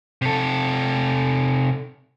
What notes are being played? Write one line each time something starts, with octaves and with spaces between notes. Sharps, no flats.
C3 A4